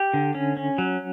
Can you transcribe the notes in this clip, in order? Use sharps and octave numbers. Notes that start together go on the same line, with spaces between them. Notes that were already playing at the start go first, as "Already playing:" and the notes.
Already playing: G4
D3
C#4
C#4
F#3